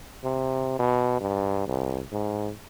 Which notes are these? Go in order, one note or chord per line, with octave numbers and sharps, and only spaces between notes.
C3
B2
G2
C2
G#2